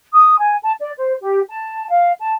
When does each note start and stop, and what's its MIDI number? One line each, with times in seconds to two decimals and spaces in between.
0.12 0.37 87
0.38 0.54 80
0.62 0.72 81
0.78 0.91 74
0.97 1.12 72
1.20 1.40 67
1.49 1.84 81
1.89 2.11 77
2.19 2.32 81